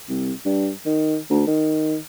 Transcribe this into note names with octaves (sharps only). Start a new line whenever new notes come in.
C2
G2
D#3
D2
D#3